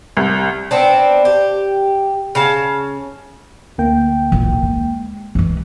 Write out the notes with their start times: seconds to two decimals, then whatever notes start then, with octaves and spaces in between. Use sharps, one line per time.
0.17 C2
0.71 B3 C4 D4
1.25 G4
2.35 C#3 F5 A5
3.78 D2 A#3 G5
4.32 D1 A#1
4.63 G#3
5.35 E3 G#3